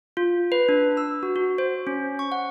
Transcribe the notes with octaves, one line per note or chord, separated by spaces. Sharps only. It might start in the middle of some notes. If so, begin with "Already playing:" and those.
F4
B4
D4
E6
F#4
F#4
C5
C#4
C#6
F#5